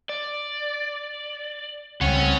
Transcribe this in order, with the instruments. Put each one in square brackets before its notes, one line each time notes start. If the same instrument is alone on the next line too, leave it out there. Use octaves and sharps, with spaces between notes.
[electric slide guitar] D5
[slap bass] C#2 G3 [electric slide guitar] C4 F#5 [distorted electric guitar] C#4